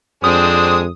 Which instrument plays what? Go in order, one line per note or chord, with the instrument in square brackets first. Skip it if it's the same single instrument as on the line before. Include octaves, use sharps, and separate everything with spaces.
[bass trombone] F2 [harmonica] G#3 C4 D4 [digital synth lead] D#6